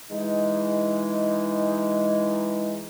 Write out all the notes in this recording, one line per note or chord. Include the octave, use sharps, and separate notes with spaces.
E3 G#3 D#4